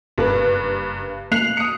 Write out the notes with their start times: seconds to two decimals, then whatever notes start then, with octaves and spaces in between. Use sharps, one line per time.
0.18 F#1 G2 A#3 B4
1.32 A#3 F#6 C7 F7
1.57 D#6 C#7